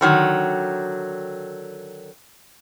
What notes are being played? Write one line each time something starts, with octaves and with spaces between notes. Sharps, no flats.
D3 D#3 F#3